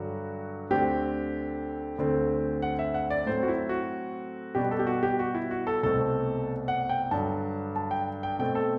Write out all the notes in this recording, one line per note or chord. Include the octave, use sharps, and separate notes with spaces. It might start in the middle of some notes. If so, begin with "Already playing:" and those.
Already playing: G2 D3 F#3 F#4
D2 D3 A3 C4 G4
D2 D3 A3 C4
F#5
E5
F#5
D5
A2 F#3 A3 C4 C5
F#4
E4
F#4
B2 G3 B3 G4
A4
G4
F#4
G4
F#4
E4
F#4
A4
C2 B2 A3 C4 A4
F#5
G5
G2 D3 F#3 A5
A5
G5
G5
B2 A3 C4 G5
A4